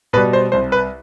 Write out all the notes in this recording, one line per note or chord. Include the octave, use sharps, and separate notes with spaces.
B2 G3 B4
C5
C2 C5
B4